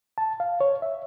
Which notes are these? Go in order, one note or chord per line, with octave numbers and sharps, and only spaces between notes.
A5
F5
C#5
E5